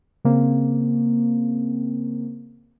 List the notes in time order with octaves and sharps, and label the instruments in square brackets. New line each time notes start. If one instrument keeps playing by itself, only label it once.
[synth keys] C#3 A#3 C4